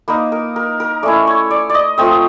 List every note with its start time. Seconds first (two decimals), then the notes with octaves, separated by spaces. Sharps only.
0.08 A#3 D#4 B4
0.32 A#4
0.56 A#4
0.80 A#4
1.03 A3 C#4 E4 D5
1.27 C#5
1.51 D5
1.70 D5
1.75 D#5
1.98 F3 A3 C4 D#5